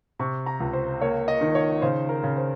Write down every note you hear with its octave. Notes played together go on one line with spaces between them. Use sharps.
C3 C#6
A#5
C#2
C5
A#3 C#5
D#5
D#3
C#5
C#3 C5
A#4
C#3
C5